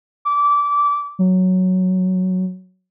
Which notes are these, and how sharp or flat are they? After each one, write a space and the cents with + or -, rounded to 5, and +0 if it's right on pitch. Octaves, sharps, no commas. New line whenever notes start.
D6 -20
F#3 +0